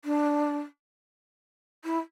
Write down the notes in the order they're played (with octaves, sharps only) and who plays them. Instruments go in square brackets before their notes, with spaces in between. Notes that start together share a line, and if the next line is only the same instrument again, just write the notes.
[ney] D4
E4